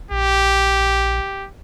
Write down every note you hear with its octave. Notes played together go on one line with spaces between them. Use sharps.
A#1 G4